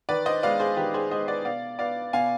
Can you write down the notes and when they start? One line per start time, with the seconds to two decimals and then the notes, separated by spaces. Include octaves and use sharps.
0.09 D#3 B4 D5
0.26 C5 D#5
0.43 G#3 B3 D5 F5
0.60 G#4 C5
0.77 D#3 G4 B4
0.94 G#4 C5
1.11 G#3 B3 C5 D#5
1.28 B4 D5
1.45 B2 D5 F5
1.79 B3 D5 F5
2.13 B2 F5 G#5